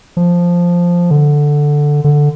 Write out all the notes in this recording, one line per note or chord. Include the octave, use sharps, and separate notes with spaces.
F3
D3
D3